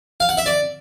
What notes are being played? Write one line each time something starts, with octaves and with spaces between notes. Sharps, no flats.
F5
F#5
E5
D5